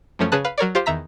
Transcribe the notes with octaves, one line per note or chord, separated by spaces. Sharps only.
F#2 F3 A3 C#4
C#3 C#4 G#4 B4 A5 F#6
B4 F5
F#3 A#4 C#5 D5
F4 G4 C5 F5 C6
E2 D#3 E5 A#5 B6